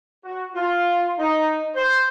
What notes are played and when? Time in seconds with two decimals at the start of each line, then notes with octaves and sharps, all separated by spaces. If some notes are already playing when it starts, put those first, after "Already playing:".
0.25 F#4
0.55 F4
1.19 D#4
1.75 C5